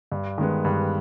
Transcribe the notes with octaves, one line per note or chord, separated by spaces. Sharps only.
G2
D#3 G#3 B3
G2